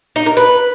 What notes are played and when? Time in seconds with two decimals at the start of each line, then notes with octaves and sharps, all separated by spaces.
0.16 D#4
0.26 A#4
0.37 B4